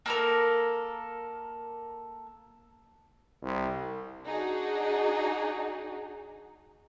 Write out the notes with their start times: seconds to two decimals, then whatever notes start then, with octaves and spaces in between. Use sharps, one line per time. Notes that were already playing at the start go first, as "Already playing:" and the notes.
0.06 A#3 A4 A#4
3.43 C2
4.24 D4 D#4 F#4 G#4